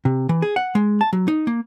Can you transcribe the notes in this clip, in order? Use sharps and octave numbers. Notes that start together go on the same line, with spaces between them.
C3
E3
G#4
F#5
G#3
A5
F#3
D#4
A#3